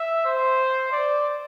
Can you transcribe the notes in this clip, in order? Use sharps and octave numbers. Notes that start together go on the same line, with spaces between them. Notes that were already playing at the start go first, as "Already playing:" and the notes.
Already playing: E5
C5
D5